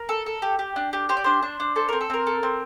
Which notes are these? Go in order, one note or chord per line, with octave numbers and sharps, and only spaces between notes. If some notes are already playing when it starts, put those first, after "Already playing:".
Already playing: A#4
A4
A4
G4
G4
D4
G4
G4 C5
D5
D4 C5
D4
D4
A4 C5
C4 A#4
A4
C4 A#4
A4
C4